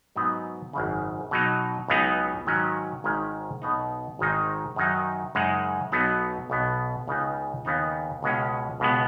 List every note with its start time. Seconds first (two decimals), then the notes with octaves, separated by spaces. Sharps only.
0.16 G#2 F#3 B3 D#4
0.73 G#1 F#2 C#3
1.31 B2 F#3 D#4
1.88 C#2 C#3 F#3 B3 D#4
2.47 G#2 D#3 F#3 C#4
3.04 G#1 G#2 D#3 G#3 C#4
3.62 B1 B2 B3 D#4
4.19 G#1 G#2 D#3 G#3 D#4
4.76 F#2 D#3 F#3 D#4
5.35 F#2 C#3 G#3 D#4
5.92 B1 B2 F#3 B3 D#4
6.50 B1 B2 B3
7.08 C#2 C#3 B3 D#4
7.65 D#2 C#3 B3 D#4
8.23 C#2 B2 G#3 C#4
8.80 C#2 B2 G#3 B3